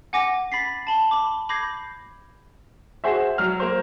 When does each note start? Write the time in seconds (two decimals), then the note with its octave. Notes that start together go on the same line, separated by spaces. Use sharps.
0.13 F#5 G#5 D6 A#6
0.52 B5 A6 B6 C7
0.87 A5 B5 G7
1.11 B5 D6
1.49 B5 D6 G6 G#6 A#6 C7
3.04 F#4 G#4 C5 E5
3.38 F#3 F6
3.60 A#3 C5